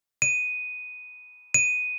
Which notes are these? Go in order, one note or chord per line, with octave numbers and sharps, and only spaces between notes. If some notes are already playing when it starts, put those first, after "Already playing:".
D#7
D#7